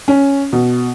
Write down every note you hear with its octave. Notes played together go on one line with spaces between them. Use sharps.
C#4
B2